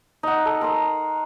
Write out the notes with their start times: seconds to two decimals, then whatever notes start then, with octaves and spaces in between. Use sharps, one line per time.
0.23 D#4 F#5
0.45 A4
0.61 A#4 C6 D#6